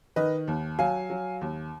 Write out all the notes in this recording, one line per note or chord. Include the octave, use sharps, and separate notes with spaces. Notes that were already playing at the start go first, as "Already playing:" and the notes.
D#3 B4 D#5
D#2
F#3 F5 G#5
F#3
D#2